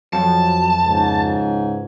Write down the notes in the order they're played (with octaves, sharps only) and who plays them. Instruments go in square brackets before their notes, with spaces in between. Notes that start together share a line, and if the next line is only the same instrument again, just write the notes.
[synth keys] F2 [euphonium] F#3 [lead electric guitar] A5
[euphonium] C#2 [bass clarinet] G#2